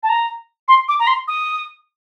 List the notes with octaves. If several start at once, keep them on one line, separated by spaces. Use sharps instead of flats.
A5
A#5
C6
D6
A#5
C6
D#6